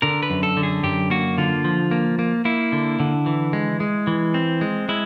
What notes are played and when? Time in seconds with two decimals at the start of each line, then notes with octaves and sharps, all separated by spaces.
0.02 D3 A#4
0.23 B4
0.30 F#2
0.43 A4
0.57 D3
0.63 G#4
0.83 F#2 G4
1.10 A#3 F#4
1.38 D3 F4
1.65 F3
1.91 A#3
2.19 A#3
2.45 A#3 E4
2.72 D3
3.00 D3
3.26 E3
3.53 G#3
3.80 G#3
4.07 E3
4.34 C4
4.61 G#3
4.89 G#3 E4